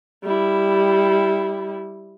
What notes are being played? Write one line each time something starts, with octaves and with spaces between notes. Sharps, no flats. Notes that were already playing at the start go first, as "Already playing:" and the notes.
G3 E4